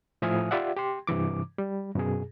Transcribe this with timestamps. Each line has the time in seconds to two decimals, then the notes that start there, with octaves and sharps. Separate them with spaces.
0.22 A2 F3 E5 G#5 D#6 F6
0.51 F4 G4 D5 E5 F#5
0.77 G4 G5 C6
1.07 G2 C3 E3 D6
1.58 G3
1.95 F#2 B2 G#4